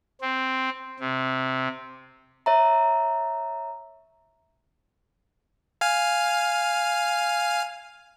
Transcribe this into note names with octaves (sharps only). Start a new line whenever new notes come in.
C4
C3
C#5 E5 A#5
F5 G#5 F6